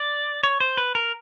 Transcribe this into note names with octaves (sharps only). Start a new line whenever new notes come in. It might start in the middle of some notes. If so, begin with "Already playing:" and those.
Already playing: D5
C#5
C5
B4
A#4